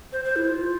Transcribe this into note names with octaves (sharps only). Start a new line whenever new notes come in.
C5
C5
E4
F4